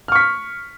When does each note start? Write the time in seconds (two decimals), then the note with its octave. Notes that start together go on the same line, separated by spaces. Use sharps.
0.08 F6
0.12 C#6
0.16 B6